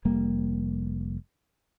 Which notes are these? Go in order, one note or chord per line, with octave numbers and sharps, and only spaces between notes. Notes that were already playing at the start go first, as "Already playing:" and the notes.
F1 G3 A#3